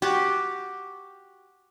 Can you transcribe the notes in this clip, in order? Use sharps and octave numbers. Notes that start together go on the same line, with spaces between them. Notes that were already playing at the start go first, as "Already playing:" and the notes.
F#4 G4